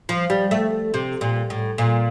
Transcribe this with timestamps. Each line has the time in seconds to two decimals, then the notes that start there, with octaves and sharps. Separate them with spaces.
0.09 F3
0.30 G3
0.51 A3
0.94 C3
1.21 A#2
1.50 A2
1.78 A#2